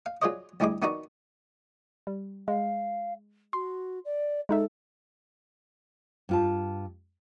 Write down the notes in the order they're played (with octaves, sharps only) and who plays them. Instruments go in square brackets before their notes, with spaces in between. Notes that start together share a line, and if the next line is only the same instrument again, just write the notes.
[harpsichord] F5
F#3 F4 G#4 C5 D5 D#5
D2 G3 E4 G#4 D#5 D6
D#3 B3 D#4 F#4 D5 A#5
[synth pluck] G3
[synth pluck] G#3 [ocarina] F5
[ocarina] F#4 [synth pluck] C6
[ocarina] D5
[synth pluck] G#3 D#4 E5 [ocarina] A4
[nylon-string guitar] G2 F4 A5